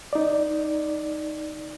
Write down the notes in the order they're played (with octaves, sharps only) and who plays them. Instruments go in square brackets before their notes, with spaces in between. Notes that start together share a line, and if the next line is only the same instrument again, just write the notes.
[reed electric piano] D#4 D5